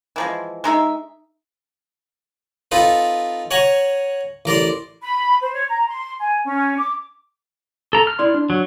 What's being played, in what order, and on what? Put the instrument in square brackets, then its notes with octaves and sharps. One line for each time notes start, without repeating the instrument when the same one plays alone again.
[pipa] E3 F3 G#3
G#3 D#4 E5
[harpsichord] C4 D#4 F4 A4 B4
C#5 F#5 G#5 A#5 C#6
A1 A#4 D5 C6
[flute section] B5
C5
C#5
A#5
C6
G#5
C#4
D6
[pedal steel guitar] A4 A#5
F6
[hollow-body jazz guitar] E4 D5 C6
D4
[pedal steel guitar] F#3